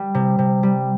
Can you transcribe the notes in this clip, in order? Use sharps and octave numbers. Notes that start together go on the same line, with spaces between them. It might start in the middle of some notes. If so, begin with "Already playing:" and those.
Already playing: G3
C3
C3
G3